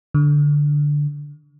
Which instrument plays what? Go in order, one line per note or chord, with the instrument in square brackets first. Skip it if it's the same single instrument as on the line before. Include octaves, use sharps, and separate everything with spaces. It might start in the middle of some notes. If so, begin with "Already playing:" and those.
[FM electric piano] D3